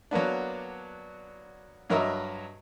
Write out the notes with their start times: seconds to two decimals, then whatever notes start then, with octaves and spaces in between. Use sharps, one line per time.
0.11 F#3 A#3 B3 D4
1.90 G2 F#3 A#4 D#5 E5